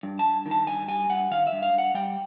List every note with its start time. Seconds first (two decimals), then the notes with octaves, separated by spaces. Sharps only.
0.03 G2
0.19 A5
0.24 G2
0.46 D#3
0.51 A5
0.67 G2 G#5
0.88 G3 G#5
1.10 G2 F#5
1.31 D#3 F5
1.47 E5
1.52 G2
1.63 F5
1.73 G2
1.78 F#5
1.94 G3 G5